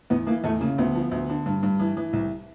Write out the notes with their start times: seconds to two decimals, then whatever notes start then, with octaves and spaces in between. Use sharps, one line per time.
0.10 E2 B3
0.27 E3 A#3
0.44 E2 A3
0.61 C#3 A#3
0.78 D2 B3
0.95 F3
1.11 D2
1.29 D3
1.46 G2
1.63 G2
1.80 E3
1.97 E3
2.13 C2